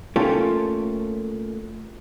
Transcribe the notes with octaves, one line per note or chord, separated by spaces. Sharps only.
A3 A#3 C#4 F4 G4 A4